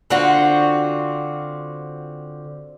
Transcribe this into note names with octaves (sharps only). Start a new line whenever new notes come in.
D3 C4 F4 F#4